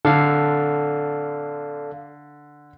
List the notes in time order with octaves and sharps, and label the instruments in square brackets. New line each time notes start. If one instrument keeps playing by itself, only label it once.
[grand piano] D3 [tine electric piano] A4 D5 F5